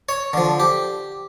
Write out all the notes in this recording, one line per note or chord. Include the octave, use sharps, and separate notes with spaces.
C#5
D3 F3
G4